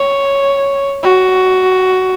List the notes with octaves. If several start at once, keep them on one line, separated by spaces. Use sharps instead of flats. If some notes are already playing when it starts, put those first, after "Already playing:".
Already playing: C#5
F#4